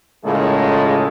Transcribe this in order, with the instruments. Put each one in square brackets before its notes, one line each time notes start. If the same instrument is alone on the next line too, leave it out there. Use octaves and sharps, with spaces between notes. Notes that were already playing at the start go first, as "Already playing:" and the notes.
[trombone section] A2 C#3 G#3 A#3 F4 A4